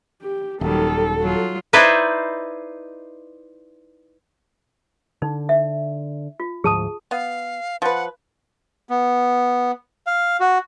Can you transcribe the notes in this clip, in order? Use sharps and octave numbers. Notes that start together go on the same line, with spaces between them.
G4
D#1 D#3 F#3 G3 A4
F#3 F4
D#4 E4 B4 C5 D5 E5
D3 D#4
E5
F4
D2 G#2 F3 G#4 A5 D#6
B3 F5
F3 B4 F#5
B3
F5
F#4